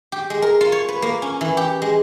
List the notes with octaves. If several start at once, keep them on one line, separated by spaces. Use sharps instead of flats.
G4
G#3
A#4
F4
C#5
B4
A#3
C#4
E3
G4
G#3